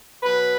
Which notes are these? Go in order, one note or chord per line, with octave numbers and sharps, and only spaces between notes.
B2 F#3 B4